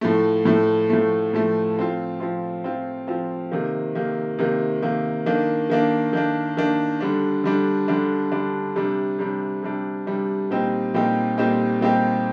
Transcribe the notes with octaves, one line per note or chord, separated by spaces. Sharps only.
A2 F3 A3
A2 F3 A3
A2 F3 A3
A2 F3 A3
F3 C4 F4
F3 C4 F4
F3 C4 F4
F3 C4 F4
C3 D#3 A#3
C3 D#3 A#3
C3 D#3 A#3
C3 D#3 A#3
D#3 A#3 D4
D#3 A#3 D4
D#3 A#3 D4
D#3 A#3 D4
D3 G3 D4
D3 G3 D4
D3 G3 D4
D3 G3 D4
C3 G3 D4
C3 G3 D4
C3 G3 D4
C3 G3 D4
A#2 G3 C4 D#4 G4
A#2 G3 C4 D#4 G4
A#2 G3 C4 D#4 G4
A#2 G3 C4 D#4 G4